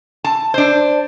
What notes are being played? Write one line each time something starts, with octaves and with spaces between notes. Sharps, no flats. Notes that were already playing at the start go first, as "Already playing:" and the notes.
A5
D4 C5